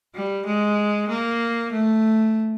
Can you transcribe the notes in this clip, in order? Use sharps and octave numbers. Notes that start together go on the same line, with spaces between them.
G3
G#3
A#3
A3